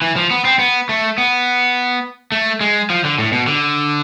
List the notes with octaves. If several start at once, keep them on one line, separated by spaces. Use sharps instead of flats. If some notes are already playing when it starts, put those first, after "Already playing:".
E3
F3
B3
C4
B3
A3
B3
A3
G#3
F3
D3
A2
B2
D3